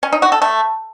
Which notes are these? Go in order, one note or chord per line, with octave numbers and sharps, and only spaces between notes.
C#4
D#4
F#4
A4
A3